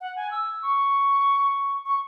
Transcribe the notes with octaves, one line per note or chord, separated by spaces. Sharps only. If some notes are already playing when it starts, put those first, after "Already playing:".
F#5
G#5
E6
C#6
C#6